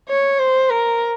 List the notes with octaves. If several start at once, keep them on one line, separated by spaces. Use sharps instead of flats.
C#5
C5
A#4